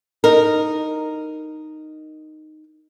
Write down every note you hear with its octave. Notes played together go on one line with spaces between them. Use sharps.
D#4 A#4